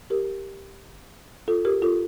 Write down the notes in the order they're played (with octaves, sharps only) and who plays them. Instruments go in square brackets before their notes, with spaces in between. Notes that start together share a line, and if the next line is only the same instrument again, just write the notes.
[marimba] G4 A#4
F4 A4
G4 A#4
F4 A4